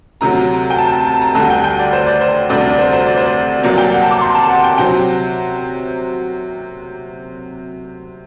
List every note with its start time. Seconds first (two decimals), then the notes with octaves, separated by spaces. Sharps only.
0.21 D2 C3 F#3 A#5
0.70 G5
0.78 A5
0.93 A5
1.07 A5
1.21 A#5
1.35 D2 D3 G3 A5
1.50 G5
1.64 G5
1.79 D5
1.93 C5
2.06 D5
2.21 C5
2.49 D2 C3 G3 D4 D5
2.63 D5
2.78 C5
2.93 C5
3.06 D5
3.17 C5
3.26 D5
3.63 C2 C3 F#3 A#3 D5
3.77 G5
3.92 F#5
4.02 A5
4.11 D6
4.21 C6
4.35 A5
4.49 F#5
4.64 G5
4.78 C3 F#3 C4 G5